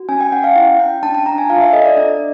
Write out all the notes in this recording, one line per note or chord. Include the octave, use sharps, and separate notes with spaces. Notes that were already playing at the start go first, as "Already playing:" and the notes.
Already playing: F#4
C#4 G#5
G5
C#4 F#5
F5
E4
C#4 G5
D4 A5
A5
D4 A#5
G#5
F4 F5
E5
A4 D#5
D5
D4 D5